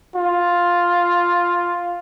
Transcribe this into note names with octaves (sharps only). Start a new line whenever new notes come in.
F4